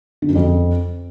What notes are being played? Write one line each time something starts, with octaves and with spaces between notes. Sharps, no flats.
D3
F#2
F2